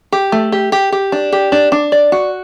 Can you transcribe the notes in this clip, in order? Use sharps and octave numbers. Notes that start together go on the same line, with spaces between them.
G4
A3
G4
G4
G4
D4
G4
D4
D4
D5
F#4